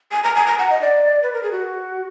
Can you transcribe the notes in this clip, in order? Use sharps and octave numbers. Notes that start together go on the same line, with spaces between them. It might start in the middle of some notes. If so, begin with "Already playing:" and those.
G#5
A#5
G#5
A#5
F#5
D#5
D5
B4
A#4
G#4
F#4